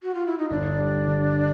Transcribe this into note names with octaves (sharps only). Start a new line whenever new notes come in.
F#4
F4
E4
D#4
G1 D4
G3
D3